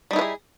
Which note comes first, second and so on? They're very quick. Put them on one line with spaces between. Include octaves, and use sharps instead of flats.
G3 D#4 E4 B4 G#4